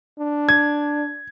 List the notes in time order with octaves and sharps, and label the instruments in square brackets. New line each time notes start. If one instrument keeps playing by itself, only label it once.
[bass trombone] D4
[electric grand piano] G#6